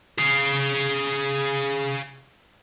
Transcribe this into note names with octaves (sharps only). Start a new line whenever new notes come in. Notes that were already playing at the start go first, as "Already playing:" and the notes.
G#4 F5